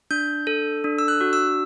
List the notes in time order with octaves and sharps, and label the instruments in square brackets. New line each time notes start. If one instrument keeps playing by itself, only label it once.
[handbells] D4 G6
A4
D4
E6
F#6
F#4
E6